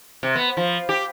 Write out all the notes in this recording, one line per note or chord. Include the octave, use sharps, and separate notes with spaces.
C3
B3
F3
G4